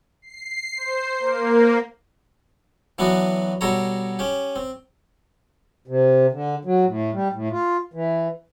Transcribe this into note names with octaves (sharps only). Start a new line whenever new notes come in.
C7
C5
A#3
E3 F#3 B3 D4 F#4
B2 G3 A4 C#5 A#5
C#4 G4
C4
C3
D3
F#3
A2
G3
A2
F4
E3